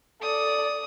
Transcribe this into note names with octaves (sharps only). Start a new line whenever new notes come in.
A4 D5 D#6